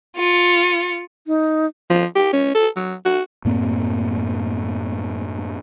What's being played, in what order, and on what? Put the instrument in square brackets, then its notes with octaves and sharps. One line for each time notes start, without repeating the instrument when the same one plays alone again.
[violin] F4 C#7
[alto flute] D#4
[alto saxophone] F3
G4
C#4
A4
F#3
F#4
[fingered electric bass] F#2 A2 A#3 C4